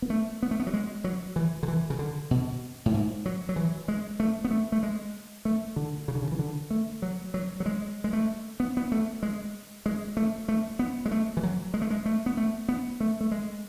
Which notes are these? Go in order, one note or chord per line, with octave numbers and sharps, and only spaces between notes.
B3
A3
B3
A3
B3
F#3
G#3
F#3
E3
D3
E3
C#3
D3
B2
A2
G#2
F#3
F#3
E3
G#3
A3
B3
A3
A3
G#3
A3
D3
C#3
D3
C#3
E3
D3
A3
F#3
F#3
F#3
G#3
G#3
A3
B3
B3
A3
G#3
G#3
A3
A3
B3
G#3
A3
E3
F#3
G#3
A3
G#3
A3
B3
A3
B3
A3
A3
G#3